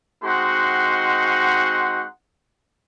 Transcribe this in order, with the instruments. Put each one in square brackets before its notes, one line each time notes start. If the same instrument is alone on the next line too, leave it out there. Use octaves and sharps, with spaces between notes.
[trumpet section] G#3 C4 D#4 F#4 F#5 C6